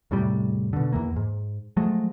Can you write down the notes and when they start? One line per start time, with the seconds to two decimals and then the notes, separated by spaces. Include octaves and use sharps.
0.11 E2 A2 C3 G3
0.73 B2 D3
0.93 E2 E3 A#3
1.16 G#2
1.77 F3 F#3 G#3 A3